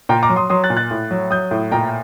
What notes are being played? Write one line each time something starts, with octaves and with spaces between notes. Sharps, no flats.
A#2 G5 A#5
A#5 D6
F#3
C6 D#6
F#3 C6 D#6
F#6 A6
A#2
F#6 A6
A2
F#3
F#3 D#6 G6
A2
A#2 G5 A#5